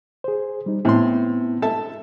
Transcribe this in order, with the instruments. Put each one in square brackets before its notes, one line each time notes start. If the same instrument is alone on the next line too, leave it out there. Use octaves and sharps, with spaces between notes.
[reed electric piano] G#4 C5
G3 D#4
[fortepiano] A2 C6 [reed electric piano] B3 C4 E4
[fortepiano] A4 E5 A5